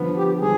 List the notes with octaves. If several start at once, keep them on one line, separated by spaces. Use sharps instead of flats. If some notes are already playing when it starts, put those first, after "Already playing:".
Already playing: D3 F3 B3
G4
D3 F3 G#4